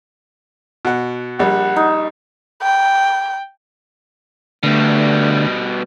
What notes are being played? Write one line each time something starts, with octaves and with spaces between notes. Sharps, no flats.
B2 F#5
A#1 G3 F#5
D#4
G5
B2 D3 G3 A3